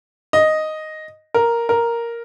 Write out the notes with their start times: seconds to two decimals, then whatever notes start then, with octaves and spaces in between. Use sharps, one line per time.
0.33 D#5
1.34 A#4
1.69 A#4